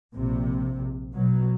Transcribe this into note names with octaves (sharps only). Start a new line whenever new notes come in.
A#1 C3
B2 F#3